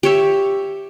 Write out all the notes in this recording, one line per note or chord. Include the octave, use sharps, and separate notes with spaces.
G4 C#5 E5